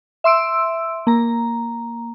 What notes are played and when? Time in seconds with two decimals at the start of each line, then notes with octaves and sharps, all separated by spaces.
0.24 E5 C6 E6 D7
1.07 A#3 A#5